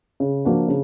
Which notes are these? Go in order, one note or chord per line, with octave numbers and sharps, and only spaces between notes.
C#3
F3 A#3 D4 F#4
C#3